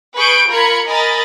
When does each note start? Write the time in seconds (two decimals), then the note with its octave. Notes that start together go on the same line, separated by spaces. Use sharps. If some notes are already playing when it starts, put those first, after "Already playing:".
0.16 G#4 B4 C#6 G6 D7
0.51 F4 A#4 A#5 B5 G#6 C#7
0.87 A#4 D#5 G#5 A#5 B5 A6